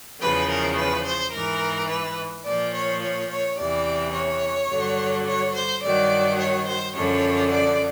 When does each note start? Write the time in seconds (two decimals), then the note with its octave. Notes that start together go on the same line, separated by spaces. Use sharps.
0.21 E2 C#3 F3 B4
0.49 A#4
0.77 B4
1.06 C5
1.33 G#2 E3 A#4
1.89 B4
2.45 A#2 F3 D5
2.73 C#5
3.02 C#5
3.30 C#5
3.57 E2 C3 E3 D5
4.14 C#5
4.70 G2 D3 F#3
5.26 C#5
5.55 C5
5.82 G2 D#3 F#3 D5
6.39 C#5
6.67 C5
6.94 F#2 D3 F3 C#5
7.51 D5